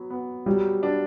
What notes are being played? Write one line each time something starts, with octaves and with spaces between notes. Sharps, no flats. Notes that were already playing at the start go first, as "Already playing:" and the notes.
Already playing: F#3 B3
B3
F#3 G3
D4